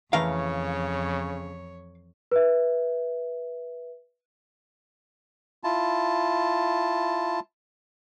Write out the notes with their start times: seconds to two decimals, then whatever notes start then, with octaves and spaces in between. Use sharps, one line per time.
0.13 F2 C#3 E3 A3 A#4 C#5 F5
2.32 B4 E5
5.64 E4 F4 A5